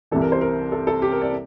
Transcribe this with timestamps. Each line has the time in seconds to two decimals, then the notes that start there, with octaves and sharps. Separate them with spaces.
0.11 C2 C3 E3 A4
0.22 A#4
0.32 C5
0.41 A#4
0.72 A4
0.87 A4
1.02 G4
1.12 A#4
1.22 D5